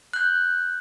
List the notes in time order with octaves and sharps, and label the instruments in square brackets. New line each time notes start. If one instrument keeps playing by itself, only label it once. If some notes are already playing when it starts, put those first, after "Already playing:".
[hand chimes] F#6 G6